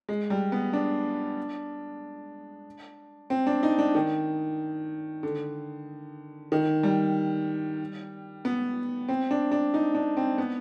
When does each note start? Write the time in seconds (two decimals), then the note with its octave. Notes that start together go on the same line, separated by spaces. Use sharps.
0.09 G#3
0.30 G3
0.52 B3
0.73 D4
3.30 C4
3.47 D4
3.63 D#4
3.79 D4
3.95 D#3
5.23 D3
6.52 D#3
6.83 G3
8.45 B3
9.09 C4
9.31 D4
9.52 D4
9.74 D#4
9.95 D4
10.17 C4
10.38 B3